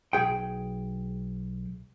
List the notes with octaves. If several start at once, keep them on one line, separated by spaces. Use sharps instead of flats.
B1 E2 G#4 G5